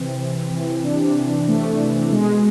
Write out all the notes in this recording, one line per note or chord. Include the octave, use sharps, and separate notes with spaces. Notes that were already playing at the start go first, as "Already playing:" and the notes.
Already playing: C3 E3 C4
E3
E3
C3 D4
E3
C3 A3
E3
B2 G#3